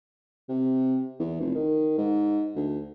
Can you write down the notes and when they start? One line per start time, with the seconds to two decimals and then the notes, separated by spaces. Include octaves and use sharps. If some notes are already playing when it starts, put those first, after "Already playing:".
0.49 C3
1.19 E2
1.40 F1
1.55 D#3
1.98 G#2
2.56 D2